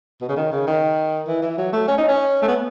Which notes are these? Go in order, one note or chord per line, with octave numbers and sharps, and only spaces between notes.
B2
C#3
D#3
C#3
D#3
E3
E3
F#3
A3
C#4
D#4
C#4
A3
B3